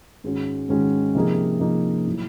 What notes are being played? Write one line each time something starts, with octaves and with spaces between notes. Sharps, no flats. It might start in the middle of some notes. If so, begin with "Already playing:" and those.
G#2 D#3 G#3 C#4 F#4
G#2 D#3 G#3 C#4 F#4
C3 F3 A#3 D#4 G#4
C3 F3 A#3 D#4 G#4
A2 F#3